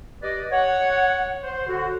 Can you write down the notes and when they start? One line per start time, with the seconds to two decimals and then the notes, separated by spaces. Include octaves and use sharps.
0.23 G4 B4 D5 D#5
0.51 C#5 F#5
1.43 C5
1.67 D3 F#4